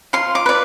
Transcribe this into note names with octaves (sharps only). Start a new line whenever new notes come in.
F4 C6
D6
B4 D5